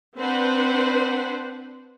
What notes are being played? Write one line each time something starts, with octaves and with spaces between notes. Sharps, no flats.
C4 D4 B4 C5 F#5